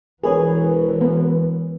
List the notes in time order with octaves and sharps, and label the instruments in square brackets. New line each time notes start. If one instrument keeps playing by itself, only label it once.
[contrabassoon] E1 [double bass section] E3 [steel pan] G#4 [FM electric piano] A#4 B4 C#5
[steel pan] B3